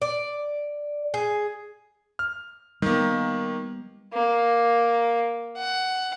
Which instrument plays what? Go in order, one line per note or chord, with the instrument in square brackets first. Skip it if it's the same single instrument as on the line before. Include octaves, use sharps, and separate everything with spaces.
[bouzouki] D5
G#4
[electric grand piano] F6
[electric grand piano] D#3 A#3 [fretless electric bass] G3 B3
[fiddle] A#3
F#5